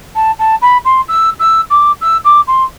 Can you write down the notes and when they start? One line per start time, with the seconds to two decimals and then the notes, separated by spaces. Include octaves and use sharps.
0.15 A5
0.39 A5
0.61 B5
0.84 C6
1.08 E6
1.39 E6
1.70 D6
2.01 E6
2.24 D6
2.47 C6